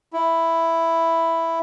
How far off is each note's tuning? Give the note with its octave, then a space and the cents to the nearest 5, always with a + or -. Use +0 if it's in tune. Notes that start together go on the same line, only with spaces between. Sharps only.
E4 +0